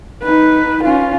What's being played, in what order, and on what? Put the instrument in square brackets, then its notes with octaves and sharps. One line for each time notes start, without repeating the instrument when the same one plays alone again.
[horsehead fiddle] D#4 B4
C#4 F4